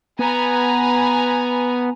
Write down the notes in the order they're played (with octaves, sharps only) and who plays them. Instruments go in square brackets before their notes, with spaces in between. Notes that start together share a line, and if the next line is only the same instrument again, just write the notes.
[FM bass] B3 [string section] B4 G#5 A#5